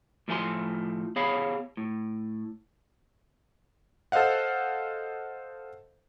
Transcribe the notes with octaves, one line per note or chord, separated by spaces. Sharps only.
A2 F3 A3 A4 G#5 C6
B3 G#4 C#5 F5 B5
A2
A4 C5 D#5 F5 F#5